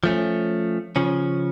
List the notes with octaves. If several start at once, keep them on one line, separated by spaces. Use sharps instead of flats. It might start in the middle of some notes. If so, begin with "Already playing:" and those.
F3 A3 C#4
C#3 F3 C#4